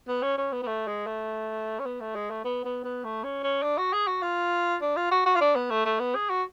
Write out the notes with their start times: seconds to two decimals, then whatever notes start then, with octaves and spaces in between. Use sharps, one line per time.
0.08 B3
0.23 C#4
0.38 C#4
0.52 B3
0.63 B3
0.67 A3
0.87 G#3
1.06 A3
1.79 C#4
1.86 B3
2.01 A3
2.15 G#3
2.30 A3
2.45 B3
2.65 B3
2.84 B3
3.04 A3
3.24 C#4
3.43 C#4
3.63 D4
3.78 F#4
3.93 G#4
4.07 F#4
4.22 F4
4.82 D4
4.97 F4
5.11 F#4
5.26 F#4
5.36 F4
5.41 D4
5.56 B3
5.70 A3
5.85 A3
6.00 B3
6.15 G#4
6.30 F#4